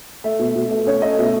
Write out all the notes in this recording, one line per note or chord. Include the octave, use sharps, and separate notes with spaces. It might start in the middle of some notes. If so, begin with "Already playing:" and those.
A3 E5
B2
B2
A3
C#4 C#5
A3 D#5
B2 E5